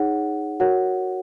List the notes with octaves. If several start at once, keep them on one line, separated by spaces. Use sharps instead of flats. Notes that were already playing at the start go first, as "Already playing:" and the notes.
Already playing: D#4 G#4 C#5 F#5
F#4 A#4 C#5 F#5